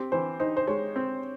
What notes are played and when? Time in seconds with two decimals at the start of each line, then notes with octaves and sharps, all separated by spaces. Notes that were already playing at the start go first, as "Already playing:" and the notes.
Already playing: C4 G4
0.12 E3 C5
0.40 D#4 C5
0.57 C5
0.67 G#3 C#5
0.96 C4